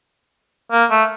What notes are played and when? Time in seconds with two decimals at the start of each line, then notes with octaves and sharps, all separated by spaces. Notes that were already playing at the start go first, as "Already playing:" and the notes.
0.72 A#3
0.90 A3